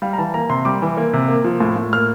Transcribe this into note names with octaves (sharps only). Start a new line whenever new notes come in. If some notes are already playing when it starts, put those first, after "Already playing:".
G3 F5
A#5
E3 A5
A#3 A#5
C3 C6
G3 D6
E3
A#3
C3
A#3
F3
A2
A2
A#3 F6